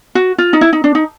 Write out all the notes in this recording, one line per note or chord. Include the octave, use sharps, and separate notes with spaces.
F#4
F4
D#4
E4
D#4
D4
D#4